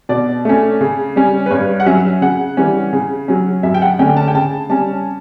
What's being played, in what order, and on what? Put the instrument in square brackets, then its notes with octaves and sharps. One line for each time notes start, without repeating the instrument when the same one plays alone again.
[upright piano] B2 D5
A3 C#4
C#3
G3 C#4
B4
G2 C#5
F#5
F#3 C#4 E5
C#3 F#5
E3 G3 C#4
C#3
F#3 C#4
F#2 E5
G5
F#5
D3 A3 C#4 G5
A5
G5
C#3 A5
G3 C#4 A5